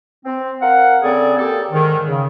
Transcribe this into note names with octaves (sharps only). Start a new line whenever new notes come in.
C4
A#4 F5 F#5
C#3 A3 C4 G#4 D5
A#3 G4 A4
G#2 D#3
C#3